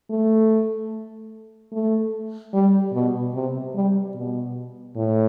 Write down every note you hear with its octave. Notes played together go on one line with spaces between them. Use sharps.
A3
A3
G3
B2
C3
G3
B2
A2